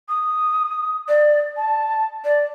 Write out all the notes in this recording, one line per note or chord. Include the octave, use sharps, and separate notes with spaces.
D#6
D5
A5
D5